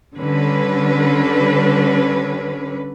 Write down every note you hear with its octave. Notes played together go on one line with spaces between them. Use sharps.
D3 G3 C#4 B4